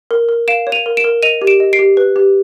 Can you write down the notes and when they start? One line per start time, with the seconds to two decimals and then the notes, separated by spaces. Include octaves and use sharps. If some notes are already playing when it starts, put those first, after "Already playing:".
0.11 A#4
0.29 A#4
0.48 F5 D7 E7
0.67 C#5
0.72 D#7 F7
0.86 A#4
0.97 D7 E7
1.04 A#4
1.23 D#5 D#7 F7
1.42 G4
1.47 D7 E7
1.60 D#5
1.73 C7 D7
1.79 G4
1.97 B4
2.16 G4